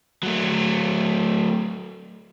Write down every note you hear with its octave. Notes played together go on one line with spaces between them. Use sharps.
F#3 A3